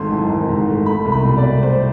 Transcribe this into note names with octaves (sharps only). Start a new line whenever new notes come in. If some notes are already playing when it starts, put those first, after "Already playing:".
Already playing: G#1 G#2 A3 A5 C6
E3
G#1
G#2
A3
A3 B5
C2
B5
B2
D5
C2
A3 C5